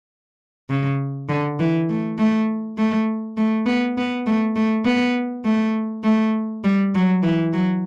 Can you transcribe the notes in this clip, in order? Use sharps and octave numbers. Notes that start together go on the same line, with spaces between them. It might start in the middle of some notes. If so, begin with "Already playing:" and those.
C#3
D3
E3
A3
A3
A3
A3
B3
B3
A3
A3
B3
A3
A3
G3
F#3
E3
F#3